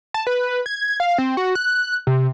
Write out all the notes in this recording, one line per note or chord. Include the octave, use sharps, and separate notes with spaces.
A5
B4
G#6
F5
C4
F#4
F#6
C3